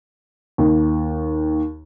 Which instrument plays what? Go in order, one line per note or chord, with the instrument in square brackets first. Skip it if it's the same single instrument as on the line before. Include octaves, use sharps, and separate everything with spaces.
[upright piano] D#2